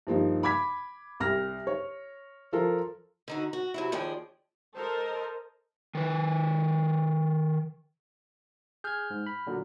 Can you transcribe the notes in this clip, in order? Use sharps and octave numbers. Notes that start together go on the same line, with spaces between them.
G2 F3 A#3 D#4
B5 D6 G#6 B6
C2 F6 A#6
C#5
F3 F4 A4 A#4
D3 D#4 F#4
F#4
C3 F#3 E4
D#2 F3 G#4 D5 G5
A4 A#4 C5 D#5
D#3 B4
G#4 F6 G6 G#6
G#2
B5
A#2 D3 F#3